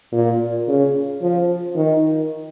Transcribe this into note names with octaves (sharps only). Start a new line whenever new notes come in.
A#2
C#3
F3
D#3